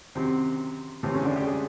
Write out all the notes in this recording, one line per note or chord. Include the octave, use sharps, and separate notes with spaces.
F#2 C3 D#3 C4
A2 C3 E3 C4
C#3 C#4
D3 D4
G3 G4
G#3 G#4